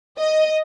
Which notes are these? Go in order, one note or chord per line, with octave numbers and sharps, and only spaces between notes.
D#5